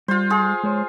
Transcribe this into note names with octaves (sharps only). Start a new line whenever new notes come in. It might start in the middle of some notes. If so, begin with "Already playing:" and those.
G3 F4 C5
F4 G#4
G#3 C5 C#5